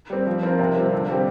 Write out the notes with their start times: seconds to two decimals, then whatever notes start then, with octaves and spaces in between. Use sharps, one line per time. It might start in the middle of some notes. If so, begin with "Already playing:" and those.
0.10 G3 C4
0.27 F3
0.43 C4 F4 A#4
0.59 C3
0.76 G3 C4 F4
0.92 D3
1.09 G3 C4 G4